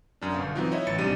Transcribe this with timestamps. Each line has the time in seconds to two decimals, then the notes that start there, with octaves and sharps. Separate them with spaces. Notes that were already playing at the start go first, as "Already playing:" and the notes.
0.22 F#2 D4
0.34 G1 B2 F5
0.55 E3 F#3 B3 C4 D#4 F4
0.72 E4 C#5 D#5 E5
0.87 A1 E3 A6 C#7
0.98 B1 C3 G3 D4 D#7